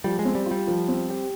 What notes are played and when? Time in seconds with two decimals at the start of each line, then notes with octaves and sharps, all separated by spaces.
0.04 F3 G3
0.19 G#3
0.25 C4
0.35 G3
0.46 F4
0.51 G3
0.67 F3
0.88 C4
1.09 G4